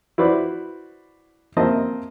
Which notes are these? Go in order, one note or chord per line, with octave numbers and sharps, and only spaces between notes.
E4 F#4 B4 C5 D5
A#3 C4 D#5 E5 A5